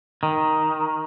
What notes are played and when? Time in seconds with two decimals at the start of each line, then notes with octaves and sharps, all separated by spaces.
0.23 D#3